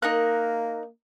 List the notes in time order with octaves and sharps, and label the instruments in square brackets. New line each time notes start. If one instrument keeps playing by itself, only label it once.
[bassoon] A#3 [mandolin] D#4 A#4 F#6